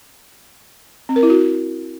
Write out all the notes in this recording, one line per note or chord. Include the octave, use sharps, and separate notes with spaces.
C4
A#4
E4
F#4